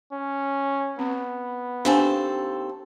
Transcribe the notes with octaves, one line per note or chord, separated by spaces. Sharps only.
C#4
B3 C4
D#2 C4 D4 A4 F5 G#5